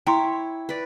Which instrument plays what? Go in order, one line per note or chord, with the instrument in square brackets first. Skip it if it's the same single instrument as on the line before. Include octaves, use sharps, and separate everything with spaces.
[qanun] E4 C#5 [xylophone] G5 A#5 C6
[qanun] B4 D5